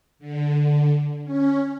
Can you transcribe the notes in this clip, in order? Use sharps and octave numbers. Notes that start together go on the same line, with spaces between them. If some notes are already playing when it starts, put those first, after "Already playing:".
D3
C#4